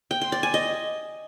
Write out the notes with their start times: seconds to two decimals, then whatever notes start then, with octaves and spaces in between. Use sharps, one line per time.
0.11 G5
0.21 C6
0.32 D5
0.43 G#5
0.54 D#5